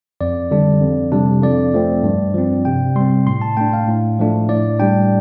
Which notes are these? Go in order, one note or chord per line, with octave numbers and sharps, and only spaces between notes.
F2 D5
D3 G3 D4
F2
C3 G3 D4
F2 D5
F3 A3 C4
G2
F3 C4
C3 G5
G3 C4 C6
A2 C6
A5
A3 D4 G5
F5
A2
F3 A3 D4
A2 D5
G3 D4 G5